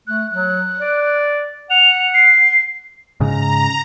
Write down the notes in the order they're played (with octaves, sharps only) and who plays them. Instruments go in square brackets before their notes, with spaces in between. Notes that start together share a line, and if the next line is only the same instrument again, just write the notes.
[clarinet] A3 [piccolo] F#6
[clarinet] F#3 [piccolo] F#6
[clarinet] D5
[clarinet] F#5 [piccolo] F7
[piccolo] C7
[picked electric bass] G#2 C#3 [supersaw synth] A#5